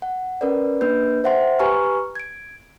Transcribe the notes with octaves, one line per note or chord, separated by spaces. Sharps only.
F#5
C#4 A#4 B4 D5
A#3 D4 B4 G6
C5 E5 F#5 G5 C6
G4 B4 G#5 A#5 C#6 F6
G#6 D7